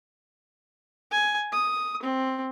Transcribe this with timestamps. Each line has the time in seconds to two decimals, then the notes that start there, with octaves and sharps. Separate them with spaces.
1.12 G#5
1.53 D#6
2.03 C4